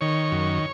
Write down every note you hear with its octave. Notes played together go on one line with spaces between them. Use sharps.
D#3 C#5
F#2